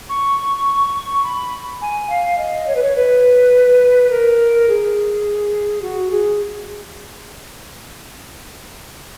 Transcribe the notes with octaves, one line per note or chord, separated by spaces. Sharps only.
C#6
B5
G#5
F5
D#5
C#5
B4
C#5
B4
A#4
G#4
F#4
G#4